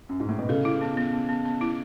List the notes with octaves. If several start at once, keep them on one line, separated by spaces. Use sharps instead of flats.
F#2
G#2
A2
B2
C#3 A4
E4
B3
B3
B3
B3
B3
E4